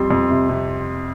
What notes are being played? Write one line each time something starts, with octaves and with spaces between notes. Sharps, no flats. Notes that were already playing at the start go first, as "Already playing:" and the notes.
Already playing: F2 G3 C6
F2
C3
C3